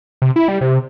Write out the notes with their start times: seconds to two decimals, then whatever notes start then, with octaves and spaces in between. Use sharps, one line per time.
0.22 C3
0.36 E4
0.48 G3
0.61 C3